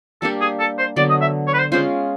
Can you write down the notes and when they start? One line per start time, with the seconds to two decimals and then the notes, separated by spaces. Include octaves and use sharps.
0.22 G3 A#3 D4 G4 A4
0.41 G#4
0.60 A4
0.78 C5
0.96 D3 F#3 B3 D5
1.10 D#5
1.21 E5
1.47 C#5
1.54 B4
1.59 C5
1.72 G#3 C#4 F4 C5